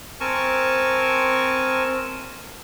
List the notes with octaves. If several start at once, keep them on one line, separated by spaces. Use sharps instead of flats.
C4 A#4 G#5 A5 C#6